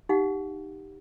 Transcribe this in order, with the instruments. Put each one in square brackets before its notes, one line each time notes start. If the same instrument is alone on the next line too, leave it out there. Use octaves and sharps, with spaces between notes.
[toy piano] D#4 G4 F5 F#5